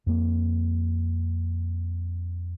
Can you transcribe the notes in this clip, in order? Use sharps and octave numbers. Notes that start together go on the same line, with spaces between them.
F2 A#3